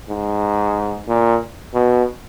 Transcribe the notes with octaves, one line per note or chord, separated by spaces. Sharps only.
G#2
A#2
B2